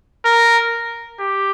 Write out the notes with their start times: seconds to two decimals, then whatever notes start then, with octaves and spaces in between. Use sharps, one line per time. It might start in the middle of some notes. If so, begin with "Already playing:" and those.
0.25 A#4
1.19 G4